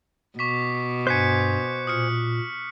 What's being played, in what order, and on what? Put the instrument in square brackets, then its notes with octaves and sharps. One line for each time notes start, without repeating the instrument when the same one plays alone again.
[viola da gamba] B2 [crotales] C#6 D6 B6
[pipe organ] G2 [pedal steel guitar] C5 G#5 [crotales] F#6 B6 C#7
[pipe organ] A#2 [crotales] D#6 F6 C#7